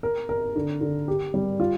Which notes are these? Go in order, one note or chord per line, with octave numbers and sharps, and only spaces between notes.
A#4
A#4
D3
D3
G4
G3
F4